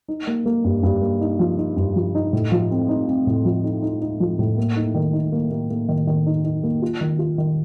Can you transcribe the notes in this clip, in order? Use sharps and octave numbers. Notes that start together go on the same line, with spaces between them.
D#4
A#3
A#3
G2
G2
A#3
D#4
F3
D#4
G2
F3
D#4
A2
F3
C4
D#4
C4
A2
F3
D#4
D#4
D#4
F3
A2
A#3
D#4
D#3
D#4
A#3
A#3
A#3
D#3
D#3
D#4
D#4
A#3
F4
D#3
F4
D#3